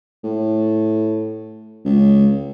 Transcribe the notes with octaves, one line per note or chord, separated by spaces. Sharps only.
A2
C#2